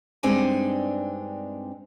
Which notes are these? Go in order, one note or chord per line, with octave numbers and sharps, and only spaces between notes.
G2 G#3 C4 D4 D#4 G#5